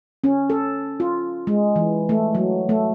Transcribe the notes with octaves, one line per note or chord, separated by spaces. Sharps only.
C#4
A4
F4
G#3
E3
A3
F#3
A3